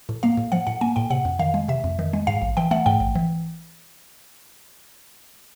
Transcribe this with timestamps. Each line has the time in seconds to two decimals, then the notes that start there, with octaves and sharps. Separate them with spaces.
0.09 A2
0.23 A#3 F5
0.37 A2
0.52 F3 F#5
0.67 A2 F#5
0.81 A#3 G#5
0.96 A2 G5
1.10 C3 F#5
1.25 F2
1.39 D#3 F5
1.54 G#3
1.68 C3 E5
1.84 F2
1.99 D#3
2.13 G#3
2.27 G#2 F5
2.42 A1
2.57 E3 G5
2.71 A3 F#5
2.86 G#2 G5
3.00 A1
3.15 E3